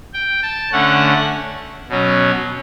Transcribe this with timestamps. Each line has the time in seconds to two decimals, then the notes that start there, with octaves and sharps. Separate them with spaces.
0.14 G5
0.43 A5
0.72 D3 A3 C#4 F#5
1.89 B2 F#3 C#4